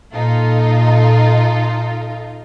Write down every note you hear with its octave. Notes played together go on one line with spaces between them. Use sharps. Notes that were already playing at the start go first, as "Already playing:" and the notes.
A#2 D#4 F4 A4